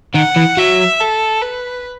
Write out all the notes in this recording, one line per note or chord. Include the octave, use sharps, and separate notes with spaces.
D#3 F#5
E3
F#3 E5
A4
B4